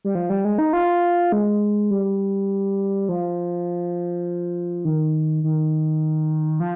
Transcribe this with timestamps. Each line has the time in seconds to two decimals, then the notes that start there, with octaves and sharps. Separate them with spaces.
0.04 G3
0.15 F3
0.30 G3
0.45 G#3
0.58 D#4
0.73 F4
1.32 G#3
1.91 G3
3.09 F3
4.85 D#3
5.44 D#3
6.60 F3